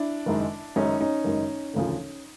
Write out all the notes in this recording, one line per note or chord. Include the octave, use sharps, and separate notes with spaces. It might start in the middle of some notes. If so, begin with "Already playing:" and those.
Already playing: D4 E4
F#1 F#2 D#3 G#3
F#1 F#2 D#3 G#3 C#4 D#4
C#4 D#4
F#1 F#2 D#3 G#3
E1 D2 C#3 F3